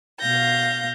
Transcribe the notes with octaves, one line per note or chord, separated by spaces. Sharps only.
B2 F5 G6 A#6